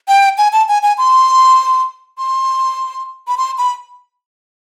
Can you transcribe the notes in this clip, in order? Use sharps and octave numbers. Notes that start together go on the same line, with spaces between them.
G5
G#5
A5
G#5
G#5
C6
C6
B5
C6
B5